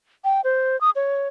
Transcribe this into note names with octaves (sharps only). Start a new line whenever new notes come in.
G5
C5
D#6
C#5